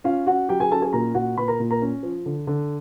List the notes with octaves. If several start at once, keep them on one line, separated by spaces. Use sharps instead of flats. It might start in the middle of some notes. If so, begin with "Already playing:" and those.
C#4 F4 F5
C#4 F#4 F#5
F#3 G4 G5
G#4 G#5
C#4 A4 A5
G#4 G#5
A#2 A#4 A#5
A#2 F#4 F#5
A#2 B4 B5
A#4 A#5
A#2
A#4 A#5
C#4
F3
D3
D3